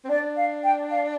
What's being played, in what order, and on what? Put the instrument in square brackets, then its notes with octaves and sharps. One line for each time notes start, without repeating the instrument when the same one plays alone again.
[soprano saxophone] C4
[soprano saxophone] D4 [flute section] D5
[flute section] F5
G5
F5